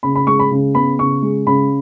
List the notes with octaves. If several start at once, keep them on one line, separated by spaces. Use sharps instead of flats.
C#3 B5
B5
G#3 C#6
B5
C#3
B3 B5
C#3 C#6
G#3
C#3 B5